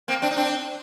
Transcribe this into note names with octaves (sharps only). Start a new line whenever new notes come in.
A#3 C4
C4 D4
D#4
C4 D4